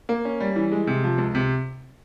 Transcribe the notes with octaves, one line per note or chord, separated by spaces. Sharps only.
A#3
C#4
G3
E3
G#3
C3
F3
C#2
C3